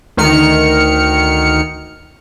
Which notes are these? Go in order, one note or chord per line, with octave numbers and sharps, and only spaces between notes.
D2 D#3 F6 C#7